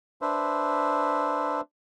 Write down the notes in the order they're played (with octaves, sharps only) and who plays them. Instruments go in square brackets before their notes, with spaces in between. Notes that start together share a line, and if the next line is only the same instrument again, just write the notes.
[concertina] D4 B4 C5 E5